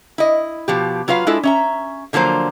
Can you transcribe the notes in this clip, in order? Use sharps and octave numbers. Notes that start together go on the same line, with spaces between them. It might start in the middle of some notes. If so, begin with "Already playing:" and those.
E4 D#5
B2 F3 G4
F#3 F4 B4 F5
G#3 D4 E4 F4 A4
C#4 E5 A#5
D3 F3 F#3 A#3 C5